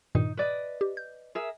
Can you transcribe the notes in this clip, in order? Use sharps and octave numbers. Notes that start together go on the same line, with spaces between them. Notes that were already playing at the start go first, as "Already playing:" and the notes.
G2 A#2 D#3 D#4
B4 D5 D#5
G4
G6
G#4 A#4 E5